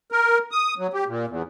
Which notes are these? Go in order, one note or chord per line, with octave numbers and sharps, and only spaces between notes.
A#4
D#6
F#3
G4
A#2
E2